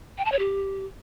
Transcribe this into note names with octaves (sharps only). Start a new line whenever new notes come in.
G5
A5
C#5
G4